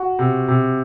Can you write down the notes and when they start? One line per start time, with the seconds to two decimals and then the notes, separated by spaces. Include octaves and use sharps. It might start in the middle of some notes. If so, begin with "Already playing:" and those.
Already playing: F#4
0.19 C3
0.48 C3